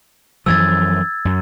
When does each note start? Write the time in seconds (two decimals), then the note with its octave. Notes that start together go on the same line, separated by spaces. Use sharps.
0.46 F#2 E3 F3 E6 G#6 A6
1.25 F#2